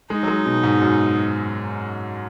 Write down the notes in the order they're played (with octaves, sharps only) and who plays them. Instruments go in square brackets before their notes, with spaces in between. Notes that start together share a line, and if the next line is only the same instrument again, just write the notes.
[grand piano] G#3 [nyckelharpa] D#4
[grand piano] F#3
G#3
B2
G#2
F#2